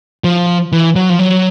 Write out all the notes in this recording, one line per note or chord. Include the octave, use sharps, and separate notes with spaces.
F3
E3
F#3
F3
F#3